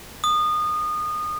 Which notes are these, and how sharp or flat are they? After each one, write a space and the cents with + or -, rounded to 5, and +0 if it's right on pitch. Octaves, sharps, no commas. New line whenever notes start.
D#6 -25